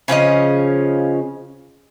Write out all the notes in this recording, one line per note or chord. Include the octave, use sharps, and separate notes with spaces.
C#3 F3 C#4 D#5